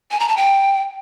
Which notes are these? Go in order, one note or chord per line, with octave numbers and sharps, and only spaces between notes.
G#5
A#5
A5
G5